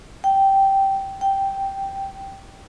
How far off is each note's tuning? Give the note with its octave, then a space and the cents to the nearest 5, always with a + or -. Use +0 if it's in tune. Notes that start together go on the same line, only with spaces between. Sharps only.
G5 -10
G5 -5